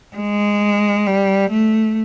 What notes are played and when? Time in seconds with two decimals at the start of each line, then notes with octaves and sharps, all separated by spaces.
0.16 G#3
1.07 G3
1.51 A3